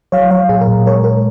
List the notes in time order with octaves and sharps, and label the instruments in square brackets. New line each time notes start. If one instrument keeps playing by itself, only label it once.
[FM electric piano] F#3 C#5 F5
F#3 C#5 F5
A#2 G#4
A#4
A#2
G#3 A#4 C#5
G#3 A#4